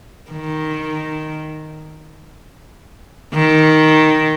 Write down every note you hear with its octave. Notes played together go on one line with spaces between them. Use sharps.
D#3
D#3